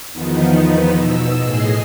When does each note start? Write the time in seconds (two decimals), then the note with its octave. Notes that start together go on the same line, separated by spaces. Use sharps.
0.13 E2 D#3 F3 B3 D#4
0.95 B2 E6
1.43 A2 G#4 D#5 C7